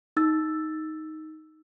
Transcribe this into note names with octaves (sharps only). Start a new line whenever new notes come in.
D#4 E6 A6